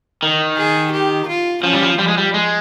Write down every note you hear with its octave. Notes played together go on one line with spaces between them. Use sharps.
D#3
G#4
G4
F4
F3 C#4
G3
F3
F3 G3
G#3
G3
G#3